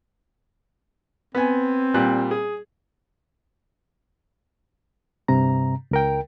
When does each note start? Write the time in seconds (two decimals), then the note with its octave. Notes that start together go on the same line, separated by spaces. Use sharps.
1.35 B3 C4 G#5
1.94 A#2 G3 F#6
2.31 G#4
5.28 G2 C3 A#5
5.91 C#2 A#4 G5